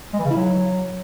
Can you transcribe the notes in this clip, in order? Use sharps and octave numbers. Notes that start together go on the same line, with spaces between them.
G#3
E3
C#3
E4
F#3